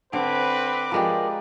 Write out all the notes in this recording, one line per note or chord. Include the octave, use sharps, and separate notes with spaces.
D3 C4 B4 D6
F3 G#3 G4 A#4 D5